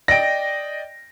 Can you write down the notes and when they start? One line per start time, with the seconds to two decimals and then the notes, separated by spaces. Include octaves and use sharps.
0.08 D5 D#5 G5 A#6 D7